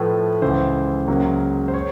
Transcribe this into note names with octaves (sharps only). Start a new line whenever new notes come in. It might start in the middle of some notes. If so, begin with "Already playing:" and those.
Already playing: A2 F3 A3 B4
C#2 C#3 E3 C5
C#2 C#3 F#3 A#3
C5
C#5